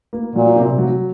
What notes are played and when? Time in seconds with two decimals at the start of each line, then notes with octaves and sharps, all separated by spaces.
0.13 A#3
0.35 A#2 F#3
0.56 C3
0.78 F#3